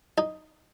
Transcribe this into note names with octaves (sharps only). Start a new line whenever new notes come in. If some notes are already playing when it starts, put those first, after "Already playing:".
D#4